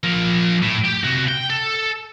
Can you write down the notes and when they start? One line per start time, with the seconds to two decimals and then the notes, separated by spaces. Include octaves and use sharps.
0.04 F3 A#4
0.62 A2
0.84 G4 G5
1.03 C3 F#4
1.28 G5
1.50 A4